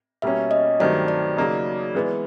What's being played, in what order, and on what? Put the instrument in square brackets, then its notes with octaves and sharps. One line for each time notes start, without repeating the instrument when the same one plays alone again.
[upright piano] B2 G3 A#3 C#4 [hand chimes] E5
[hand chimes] D#5
[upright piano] G2 D#3 F#3 A3 C4 [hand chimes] D5
[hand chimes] D5
[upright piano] C#3 F#3 A#3 D#4
E3 G#3 B3